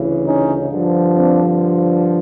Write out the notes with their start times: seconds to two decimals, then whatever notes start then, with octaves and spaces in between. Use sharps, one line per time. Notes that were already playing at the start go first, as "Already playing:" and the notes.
Already playing: D2 C#3 E3
0.27 C#4 D#4
0.71 G2 D3 F3
1.15 C4 D4